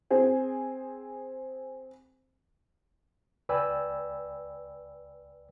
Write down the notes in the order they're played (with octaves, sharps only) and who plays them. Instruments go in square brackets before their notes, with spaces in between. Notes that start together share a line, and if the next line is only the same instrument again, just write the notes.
[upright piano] C4 G#4
[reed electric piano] C#2 B4 D5 G5 G#5 E6